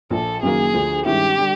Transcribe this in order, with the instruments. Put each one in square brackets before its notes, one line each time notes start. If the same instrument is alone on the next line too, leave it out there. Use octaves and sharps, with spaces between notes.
[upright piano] A#1 A#2 F3 [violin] A4
[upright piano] F#1 F#2 D#3 F#3 A#3 [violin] G#4
[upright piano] D2 D3 F3
[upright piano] G2 D#3 G#3 C#4 E4 [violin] G4
[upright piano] D3 G3